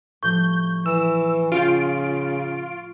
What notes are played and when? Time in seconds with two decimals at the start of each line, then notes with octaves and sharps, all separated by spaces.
0.23 A2 F3 G3 C#6 G6
0.86 E3 E6
1.52 C#3 F4 G5 C6 D7